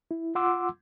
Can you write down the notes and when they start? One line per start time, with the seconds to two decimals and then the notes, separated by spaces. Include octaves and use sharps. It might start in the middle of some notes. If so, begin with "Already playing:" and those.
0.11 E4
0.35 F4 F#5 C6 D6 E6